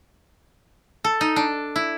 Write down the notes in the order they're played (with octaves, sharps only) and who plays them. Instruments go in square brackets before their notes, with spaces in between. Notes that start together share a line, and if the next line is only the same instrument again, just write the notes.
[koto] A4
D#4
D4
E4